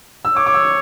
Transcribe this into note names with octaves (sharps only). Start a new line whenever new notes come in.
E6
C#5 D6
D6
E6